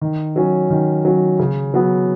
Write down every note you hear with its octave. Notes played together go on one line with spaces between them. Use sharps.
D#3
F#3 C#4
D#3
F#3 C#4
C#3
F#3 B3